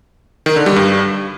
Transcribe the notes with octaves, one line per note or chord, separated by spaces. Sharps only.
D#3
D3
G3
G2